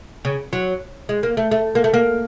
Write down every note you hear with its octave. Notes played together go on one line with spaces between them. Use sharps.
C#3
F#3
G#3
A#3
A3
A3
A#3
A3
A#3